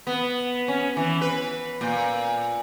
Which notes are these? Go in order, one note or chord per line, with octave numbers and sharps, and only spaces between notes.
B3
C#4
E3
B4
A#2